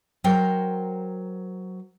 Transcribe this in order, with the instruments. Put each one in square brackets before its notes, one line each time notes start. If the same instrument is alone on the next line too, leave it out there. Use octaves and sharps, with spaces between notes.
[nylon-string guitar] F#3 A#4 C5 G5